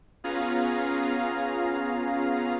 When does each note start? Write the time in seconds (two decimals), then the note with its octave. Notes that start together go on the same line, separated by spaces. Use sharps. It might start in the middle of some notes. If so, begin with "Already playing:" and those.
0.24 B3 C#4 F4 G#4 F5 A#5